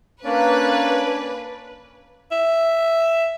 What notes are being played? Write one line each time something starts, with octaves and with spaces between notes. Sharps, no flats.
A#3 C#4 D4 B4 D5
E5